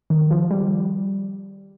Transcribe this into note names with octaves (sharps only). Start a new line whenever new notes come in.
D#3
F3
G3